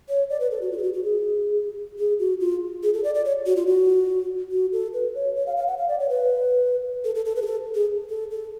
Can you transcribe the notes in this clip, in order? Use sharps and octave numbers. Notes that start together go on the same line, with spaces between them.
C#5
D5
B4
A4
F#4
F4
G#4
F#4
F#4
G#4
G#4
F#4
F4
G#4
A4
D5
D5
C#5
F#4
F4
F#4
F#4
A4
B4
C#5
C#5
F5
F5
F#5
F5
D5
C#5
B4
A4
A4
A4
B4
G#4
A4
G#4
A4
A4